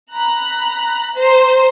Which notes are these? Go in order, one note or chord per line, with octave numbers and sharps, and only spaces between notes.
A#5 B5 F#6
C5 A#5